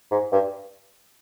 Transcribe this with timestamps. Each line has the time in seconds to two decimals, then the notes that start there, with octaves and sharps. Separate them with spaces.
0.11 G#2
0.32 G2